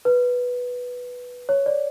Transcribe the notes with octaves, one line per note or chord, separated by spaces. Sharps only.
B4
C#5
D5